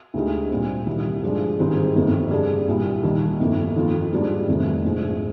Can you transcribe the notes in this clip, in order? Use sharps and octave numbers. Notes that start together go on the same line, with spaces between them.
D2 D3 G#3 D#4 G4
A#2 G3 C4
C2 C3 D#3 G3
G2 D3 F3 G#3 D4
G#1 G#2 D#3 G3 C4
G1 F2 C3 D#3 A#3
G2 D3 G3 D4 G#4
C2 A#2 G3
D#2 D#3 G3
G1 F2 D#3 A#3
F2 D#3 A#3 F4
G#2 G3 A#3 D4 F4
F1 F2 C3 D#3 G3
A#1 G#2 F3